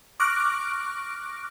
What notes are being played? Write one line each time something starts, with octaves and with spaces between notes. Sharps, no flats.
C#6 D6 F6 F#6 A#6 D7